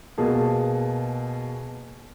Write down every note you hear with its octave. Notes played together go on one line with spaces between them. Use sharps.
B2 A#3 G#4 A5